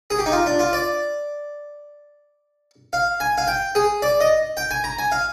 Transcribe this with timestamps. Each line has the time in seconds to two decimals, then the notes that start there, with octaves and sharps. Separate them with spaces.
0.10 G#4
0.19 G4
0.26 D#4
0.32 F4
0.46 D4
0.59 F4
0.73 D5
2.93 F5
3.20 G#5
3.38 F5
3.47 G5
3.75 G#4
4.02 D5
4.21 D#5
4.57 G5
4.71 G#5
4.84 A#5
4.99 G#5
5.12 F5